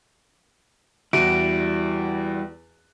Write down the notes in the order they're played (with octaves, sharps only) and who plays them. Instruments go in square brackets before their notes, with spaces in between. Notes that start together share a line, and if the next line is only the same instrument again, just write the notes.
[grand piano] E2 F#4 D#7 [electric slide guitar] G3 E4 [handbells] D7